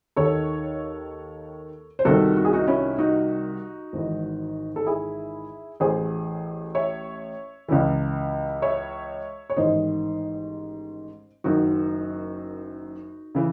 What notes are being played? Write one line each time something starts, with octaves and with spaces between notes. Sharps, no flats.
D#2 D#3 A4 C#5
C5
C2 C3 D#3 F#4 A4
F#4
G#4
D#4 F#4
C#4 E4
D#4 F#4
G#1 G#2 E3
A4
E4 G#4
A1 A2 E3 G#4 C5
C#5 E5
C#2 C#3 E3
C#5 E5
C#5
A1 G#2 D#3 C5 D#5
F#1 F#2 D#3 D#4 F#4
C#3 E3